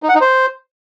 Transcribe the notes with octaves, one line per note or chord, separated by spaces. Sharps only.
D#4
F#5
D#4
C5